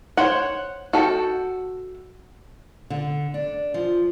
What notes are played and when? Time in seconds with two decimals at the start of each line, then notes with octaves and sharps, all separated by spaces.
0.17 C5 C#5 F#5
0.93 F#4 A4 G5
2.90 D3
3.34 D4
3.74 F3